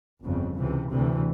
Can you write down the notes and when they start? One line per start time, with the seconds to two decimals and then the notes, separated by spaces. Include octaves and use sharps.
0.22 G1 F2 C#3
0.56 C#2 C3 E3
0.90 D2 C3 E3